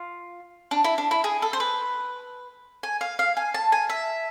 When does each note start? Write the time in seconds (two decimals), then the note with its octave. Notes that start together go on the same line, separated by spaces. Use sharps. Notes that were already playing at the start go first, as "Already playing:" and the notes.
Already playing: F4
0.71 D4
0.84 E4
0.98 D4
1.11 E4
1.24 G#4
1.42 A4
1.53 C5
1.60 B4
2.83 G#5
3.01 F5
3.19 F5
3.37 G#5
3.54 A5
3.72 G#5
3.90 E5